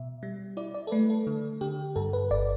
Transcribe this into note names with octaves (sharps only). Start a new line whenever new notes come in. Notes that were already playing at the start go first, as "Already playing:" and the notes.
Already playing: B2 E5
G3
E4 D5
D5
A4
A3 B4
A4
D3
D3 G4
G2 A4
B4
G1 D5